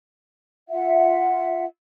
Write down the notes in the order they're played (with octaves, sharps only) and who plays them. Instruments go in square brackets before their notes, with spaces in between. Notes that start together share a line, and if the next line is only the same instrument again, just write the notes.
[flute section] F4 E5 F#5